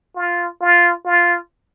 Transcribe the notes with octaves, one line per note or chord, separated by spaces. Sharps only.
F4
F4
F4